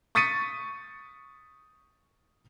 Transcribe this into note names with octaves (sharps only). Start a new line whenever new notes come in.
C#6 D#6 A6 B6 C#7 D#7